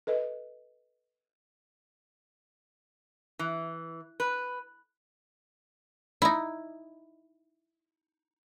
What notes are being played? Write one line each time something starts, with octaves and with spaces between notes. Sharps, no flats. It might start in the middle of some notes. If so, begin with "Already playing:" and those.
A4 B4 D#5
E3
B4
D#4 E4